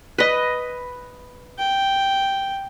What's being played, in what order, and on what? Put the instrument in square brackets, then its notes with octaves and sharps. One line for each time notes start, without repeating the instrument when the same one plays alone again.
[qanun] B4 D#5
[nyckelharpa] G5